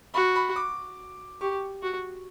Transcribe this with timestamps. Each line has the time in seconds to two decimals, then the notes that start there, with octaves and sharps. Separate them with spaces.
0.14 F#4 B5
0.36 B5
0.56 D6
1.41 G4 C#6
1.82 F#4